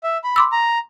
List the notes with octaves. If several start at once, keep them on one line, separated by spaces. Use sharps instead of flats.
E5
B5
C6 D6 E6
A#5